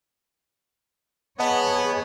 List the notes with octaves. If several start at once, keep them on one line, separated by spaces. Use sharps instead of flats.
B3 G#4 C#5 D#5 F#5 A5